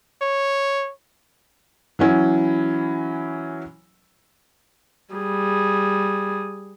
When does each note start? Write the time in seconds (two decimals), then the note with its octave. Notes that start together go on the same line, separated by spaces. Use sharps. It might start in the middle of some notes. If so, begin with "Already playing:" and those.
0.22 C#5
1.99 E3 F#3 C#4 E4
5.14 G3 G#4